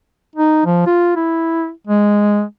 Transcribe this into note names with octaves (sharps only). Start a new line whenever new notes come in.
D#4
F3
F4
E4
G#3